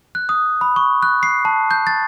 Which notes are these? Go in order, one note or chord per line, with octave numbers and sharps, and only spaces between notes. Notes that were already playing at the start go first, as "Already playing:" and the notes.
F#6
D#6
B5
C#6
F#6
C7
A5
G6
A6